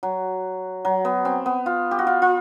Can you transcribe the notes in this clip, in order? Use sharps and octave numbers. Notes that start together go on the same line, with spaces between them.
F#3
F#3
B3
C4
B3
F4
G4
F#4
F4
F4